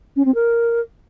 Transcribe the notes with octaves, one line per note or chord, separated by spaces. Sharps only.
C#4
C4
A#4